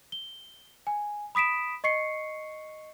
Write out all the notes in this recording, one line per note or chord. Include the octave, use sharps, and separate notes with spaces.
G7
G#5
B5 D#6 B6 D7 E7
D#5 C#6 C7 C#7